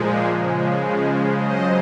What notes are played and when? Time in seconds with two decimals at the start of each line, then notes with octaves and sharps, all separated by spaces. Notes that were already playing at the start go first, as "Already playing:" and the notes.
Already playing: A#2 F3 G#3
0.29 C#3 F3 G#3
1.33 C#3 F#3 C5 D#5